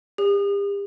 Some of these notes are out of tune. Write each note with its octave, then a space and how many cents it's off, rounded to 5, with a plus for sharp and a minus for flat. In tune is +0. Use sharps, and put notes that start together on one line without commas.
G4 +40